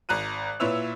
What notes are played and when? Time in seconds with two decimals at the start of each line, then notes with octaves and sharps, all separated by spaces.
0.09 G#1 A#5 F#6 D#7
0.60 A#2 E4 B4 C#5 E6 F7